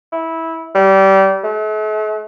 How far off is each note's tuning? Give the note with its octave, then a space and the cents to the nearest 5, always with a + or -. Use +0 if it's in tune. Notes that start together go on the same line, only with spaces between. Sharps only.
E4 -15
G3 -25
A3 -45